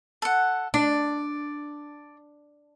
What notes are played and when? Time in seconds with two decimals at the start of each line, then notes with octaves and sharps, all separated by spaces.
0.22 A4 F#5
0.74 D4 D5